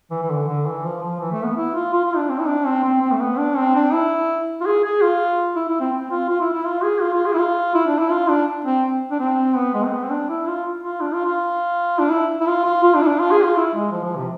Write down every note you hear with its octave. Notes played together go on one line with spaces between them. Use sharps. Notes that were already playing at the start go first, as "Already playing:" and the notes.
E3
E3
D3
D3
E3
F3
F3
E3
A3
B3
E4
F4
F4
F4
D4
C4
E4
D4
C4
C4
C4
A3
B3
D4
C4
D4
E4
F4
G#4
G#4
F4
E4
E4
C4
C4
F4
F4
E4
E4
F4
G#4
F4
F4
G#4
E4
F4
E4
D4
E4
F4
D4
C4
D4
C4
B3
G#3
C4
B3
C4
D4
E4
F4
F4
D4
F4
F4
D4
E4
E4
F4
F4
F4
D4
E4
D4
F4
G#4
F4
E4
G#3
F3
F3
C3